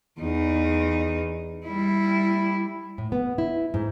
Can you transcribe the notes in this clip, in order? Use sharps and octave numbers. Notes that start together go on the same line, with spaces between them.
E2 D#4
G3 E4
A2
B3
E4
G#2